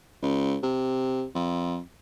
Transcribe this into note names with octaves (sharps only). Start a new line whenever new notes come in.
C#2
C3
F2